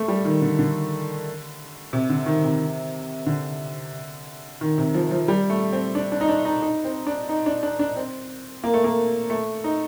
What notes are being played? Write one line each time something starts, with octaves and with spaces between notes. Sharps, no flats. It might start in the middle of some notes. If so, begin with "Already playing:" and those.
Already playing: A3
G3
D#3
D3
D3
C3
D3
D#3
C3
D3
D#3
C3
F3
F3
G3
A3
C4
D4
D4
D#4
D4
D#4
D#4
C4
D4
D#4
D4
D4
D4
C4
A#3
A3
A#3
A3
D#4